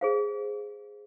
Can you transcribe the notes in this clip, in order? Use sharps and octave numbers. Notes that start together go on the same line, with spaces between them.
G#4 C5 F5